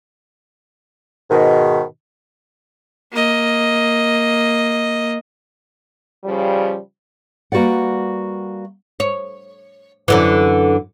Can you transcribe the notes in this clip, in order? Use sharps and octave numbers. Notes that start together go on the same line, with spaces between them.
G#2 B2 D#3
A#3 D#5
C#3 F3 G3
G3 A#3 F#4 B4 D5 F#5
C#5
F#2 D3 E3